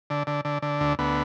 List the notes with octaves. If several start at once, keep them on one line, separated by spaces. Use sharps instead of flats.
D3
D3
D3
D3
D2
D2 B3